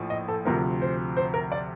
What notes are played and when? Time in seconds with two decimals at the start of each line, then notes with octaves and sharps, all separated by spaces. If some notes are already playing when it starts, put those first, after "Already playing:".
Already playing: A#1 A2 F3
0.10 D#5
0.28 A4
0.45 D2 C3 F3 A#4
0.82 C5
1.17 C5
1.34 A#4
1.52 D5